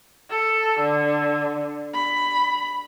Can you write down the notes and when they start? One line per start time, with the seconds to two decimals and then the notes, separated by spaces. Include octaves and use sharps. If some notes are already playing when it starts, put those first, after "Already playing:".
0.30 A4
0.80 D3
1.94 B5